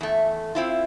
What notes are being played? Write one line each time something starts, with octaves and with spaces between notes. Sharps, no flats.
E2 A3
C4 E4 F4